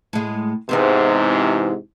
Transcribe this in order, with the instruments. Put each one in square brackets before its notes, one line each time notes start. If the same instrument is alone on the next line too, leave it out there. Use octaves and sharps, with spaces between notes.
[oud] A2 G#3
[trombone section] G#2 C3 [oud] E3 B3 C4